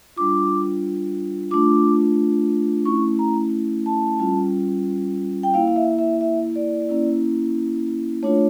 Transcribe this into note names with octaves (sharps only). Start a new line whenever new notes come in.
G3 D4 F4 D6
A3 D4 F4 D6
A3 C#4 E4 C#6
A#5
A5
G3 C#4 F4
G5
A#3 E4 F5
F5
E5
E5
E5
D5
A#3 C#4 E4
A3 D4 F4 C#5